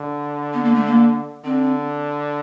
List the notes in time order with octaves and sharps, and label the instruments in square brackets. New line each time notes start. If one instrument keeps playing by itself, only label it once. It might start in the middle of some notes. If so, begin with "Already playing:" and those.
Already playing: [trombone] D3
[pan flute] B3
A#3
A3
A#3
[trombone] D3 [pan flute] C4